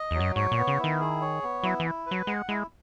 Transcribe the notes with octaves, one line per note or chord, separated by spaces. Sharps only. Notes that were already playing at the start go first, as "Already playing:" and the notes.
Already playing: D#5
E2 F#3
F#2
G#2 C#5
A#2
B3
C#3
E4
D#3
G#4
C#5
B3
F#3 E4
E3
E4
F#3 B4
G#3 F#5
G#3 E4